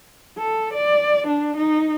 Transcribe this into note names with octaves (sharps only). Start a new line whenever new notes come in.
A4
D5
D4
D#4